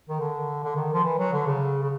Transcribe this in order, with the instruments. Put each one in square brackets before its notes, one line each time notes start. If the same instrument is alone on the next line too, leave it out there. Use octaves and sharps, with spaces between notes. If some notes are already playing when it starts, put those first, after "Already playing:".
[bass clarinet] D#3
D3
D3
D#3
F3
E3
F#3
D3
C#3
C#3